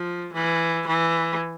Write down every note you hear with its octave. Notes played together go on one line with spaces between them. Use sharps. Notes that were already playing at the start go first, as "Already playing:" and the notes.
Already playing: F3
E3
E3